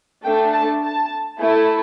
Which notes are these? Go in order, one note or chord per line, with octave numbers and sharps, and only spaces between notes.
A3 D4 A4 G5
A5
A5
A3 E4 A4